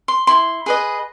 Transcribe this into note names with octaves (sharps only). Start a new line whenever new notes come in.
C6
E4 C6
G#4 B4 D#5